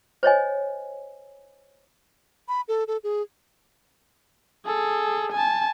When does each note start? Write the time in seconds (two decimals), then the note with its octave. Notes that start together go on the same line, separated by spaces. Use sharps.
0.23 C5 C#5 D#5 G#5
2.48 B5
2.68 A4
2.88 A4
3.04 G#4
4.65 G#4 A4
5.32 G#5 A5